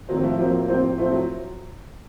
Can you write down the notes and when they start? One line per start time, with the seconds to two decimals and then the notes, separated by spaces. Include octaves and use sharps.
0.09 A2 D#3 F3 F#3 C4 F4 C5
0.24 F3 A3
0.39 A2 F3 F#3 A#3 C4 F4 C5
0.68 A2 F3 C4 F4 C5
0.98 A2 F3 A3 C4 F4 C5
1.12 F#3